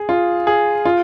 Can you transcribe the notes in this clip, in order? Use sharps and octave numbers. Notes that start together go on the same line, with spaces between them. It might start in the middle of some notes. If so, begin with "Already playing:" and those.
Already playing: G#4
F4
G#4
F4